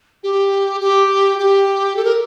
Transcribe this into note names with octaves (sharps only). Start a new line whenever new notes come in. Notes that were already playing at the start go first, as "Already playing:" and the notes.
G4
G4
G4
A4
A#4